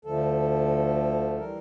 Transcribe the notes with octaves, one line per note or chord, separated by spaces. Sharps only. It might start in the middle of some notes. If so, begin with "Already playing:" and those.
D2 D3 F3 A3 A4
E3 G3 A#4